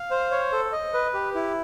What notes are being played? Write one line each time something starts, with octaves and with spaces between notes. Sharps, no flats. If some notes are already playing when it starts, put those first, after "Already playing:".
Already playing: F5
C5
C#5
A4
D#5
B4
G4
E4